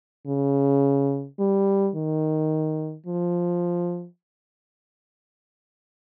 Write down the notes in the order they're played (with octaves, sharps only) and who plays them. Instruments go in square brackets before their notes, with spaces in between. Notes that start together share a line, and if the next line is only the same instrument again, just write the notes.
[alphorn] C#3
G3
D#3
F3